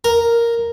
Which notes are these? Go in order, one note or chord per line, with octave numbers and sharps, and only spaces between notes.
A#4